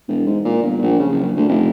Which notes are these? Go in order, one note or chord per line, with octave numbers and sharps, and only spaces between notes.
E1
G#2
A#2
G1
A#1
C#3
F#1
D2
F1